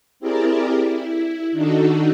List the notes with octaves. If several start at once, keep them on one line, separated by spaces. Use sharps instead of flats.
C4 E4 G4 G#4 A#4 D5
E4
D#3 D4 D#4 F#4 A4